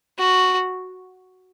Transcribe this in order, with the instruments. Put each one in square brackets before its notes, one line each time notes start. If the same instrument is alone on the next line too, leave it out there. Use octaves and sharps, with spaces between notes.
[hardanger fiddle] F#4